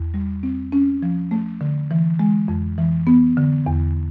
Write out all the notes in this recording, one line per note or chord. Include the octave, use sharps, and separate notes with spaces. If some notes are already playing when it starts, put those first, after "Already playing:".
Already playing: E2
G3
C4
C#4
F3
A3
D3
E3
G#3
F2
E3
B3
D3
E2